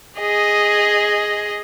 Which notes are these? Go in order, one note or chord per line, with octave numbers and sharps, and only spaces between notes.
G#4 D#5